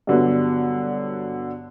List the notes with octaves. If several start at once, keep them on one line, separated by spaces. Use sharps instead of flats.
G2 B2 D3 F#3 B3